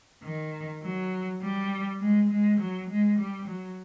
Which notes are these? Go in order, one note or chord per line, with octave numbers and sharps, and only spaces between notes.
D#3
F#3
G3
G#3
G#3
F#3
G#3
G3
F#3